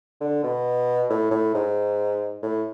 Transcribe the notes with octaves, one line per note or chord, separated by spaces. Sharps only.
D3
B2
A2
A2
G#2
A2